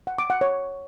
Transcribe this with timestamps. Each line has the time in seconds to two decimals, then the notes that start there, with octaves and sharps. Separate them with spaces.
0.07 F#5
0.18 D6
0.30 F#5
0.41 C#5